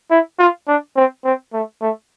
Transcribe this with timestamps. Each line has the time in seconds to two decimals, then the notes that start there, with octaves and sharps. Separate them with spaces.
0.11 E4
0.39 F4
0.67 D4
0.96 C4
1.24 C4
1.53 A3
1.82 A3